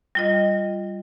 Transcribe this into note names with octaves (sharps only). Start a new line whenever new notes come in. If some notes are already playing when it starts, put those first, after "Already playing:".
G3 F4 D#5